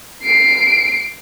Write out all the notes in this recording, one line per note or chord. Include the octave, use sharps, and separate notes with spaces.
C7 D7